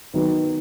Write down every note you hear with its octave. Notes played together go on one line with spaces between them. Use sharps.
D#3 F#3 B3